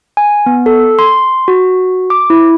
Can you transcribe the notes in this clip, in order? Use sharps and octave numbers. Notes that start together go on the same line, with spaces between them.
G#5
B3
A4
C6
F#4
D6
E4